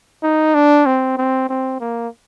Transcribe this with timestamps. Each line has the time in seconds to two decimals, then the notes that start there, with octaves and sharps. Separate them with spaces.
0.23 D#4
0.55 D4
0.86 C4
1.17 C4
1.49 C4
1.80 A#3